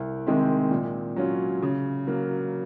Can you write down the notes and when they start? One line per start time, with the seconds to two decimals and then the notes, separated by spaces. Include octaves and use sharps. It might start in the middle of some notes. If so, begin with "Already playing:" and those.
Already playing: C2
0.27 C3 D#3 G#3 C4
0.71 A#2
1.16 F#3 C#4 F4
1.62 C#3
2.07 F#3 A#3